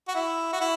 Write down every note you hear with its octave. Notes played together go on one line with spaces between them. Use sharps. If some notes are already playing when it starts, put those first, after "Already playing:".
F#4
E4
F#4
E4